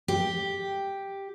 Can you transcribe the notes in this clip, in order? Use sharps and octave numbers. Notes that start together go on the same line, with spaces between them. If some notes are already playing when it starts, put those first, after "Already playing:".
G4